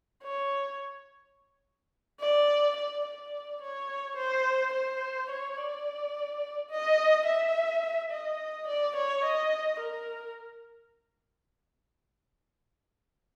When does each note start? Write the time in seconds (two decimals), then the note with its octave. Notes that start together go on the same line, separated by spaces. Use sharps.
0.23 C#5
2.20 D5
2.76 D5
3.05 D5
3.61 C#5
4.16 C5
4.73 C5
5.29 C#5
5.57 D5
6.70 D#5
7.26 E5
8.11 D#5
8.67 D5
8.96 C#5
9.24 D#5
9.80 A#4